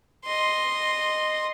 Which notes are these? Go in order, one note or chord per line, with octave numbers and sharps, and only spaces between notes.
D#5 C6